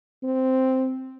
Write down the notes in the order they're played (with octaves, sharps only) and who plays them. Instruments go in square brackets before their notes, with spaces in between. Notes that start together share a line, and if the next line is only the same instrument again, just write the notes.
[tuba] C4